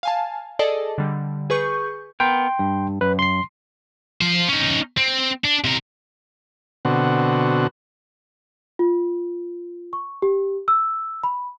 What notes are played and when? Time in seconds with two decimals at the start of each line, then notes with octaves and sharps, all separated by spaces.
0.03 F5 G#5 A5
0.59 G#4 A4 D5 D#5 A5
0.98 D3 G3
1.50 G#4 B4 C#6 G6
2.20 B3 A#4 G5 C6
2.59 G2
3.01 F#2 B4
3.19 C6 C7
4.21 F3 C5
4.49 C#4 D#4
4.98 C4
5.45 D4
5.65 C3 A#4
6.85 B2 D3 C4 F#4
8.79 F4
9.93 C#6
10.22 G4
10.68 E6
11.24 B5